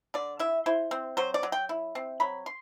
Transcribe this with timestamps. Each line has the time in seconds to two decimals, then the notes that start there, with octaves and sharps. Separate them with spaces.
0.14 D3 D5
0.39 E4 E5
0.66 E4 C5
0.91 C4
1.17 F#3 C5
1.34 D5
1.43 F#3
1.52 G5
1.69 E4
1.95 C4
2.20 F#3 B5
2.46 C6